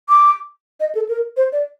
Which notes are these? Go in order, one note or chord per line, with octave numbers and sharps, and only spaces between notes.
D6
D#5
A4
A#4
C5
D5